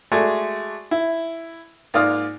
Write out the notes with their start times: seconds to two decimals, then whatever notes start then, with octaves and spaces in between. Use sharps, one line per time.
0.12 G#3 A3 F#4 D5 G#5
0.91 E4
1.94 G#2 A#3 F4 D5 D#6 F6